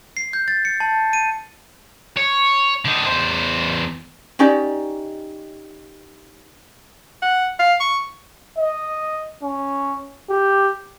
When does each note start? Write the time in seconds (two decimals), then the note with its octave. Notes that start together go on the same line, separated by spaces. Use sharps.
0.17 C7
0.33 G6
0.48 A6
0.65 C#7
0.80 A5
1.13 D#7
2.17 C#5
2.85 D3 D#4
3.06 E2 C5
4.39 C#4 D#4 G4 D5
7.22 F#5
7.60 F5
7.80 C#6
8.58 D#5
9.43 C#4
10.30 G4